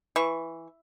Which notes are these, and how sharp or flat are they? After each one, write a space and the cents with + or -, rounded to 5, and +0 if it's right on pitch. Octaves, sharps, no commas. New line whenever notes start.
E3 +0 C#6 +0